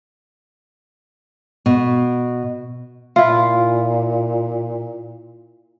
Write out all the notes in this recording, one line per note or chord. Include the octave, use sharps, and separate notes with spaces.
B2
A#2 E4 F4